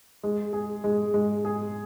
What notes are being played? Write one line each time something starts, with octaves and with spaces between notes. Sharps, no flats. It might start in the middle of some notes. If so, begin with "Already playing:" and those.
G#3
G#4
G#3
G#3
G#4